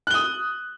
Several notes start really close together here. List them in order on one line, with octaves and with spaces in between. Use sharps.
F#6 G7 D#6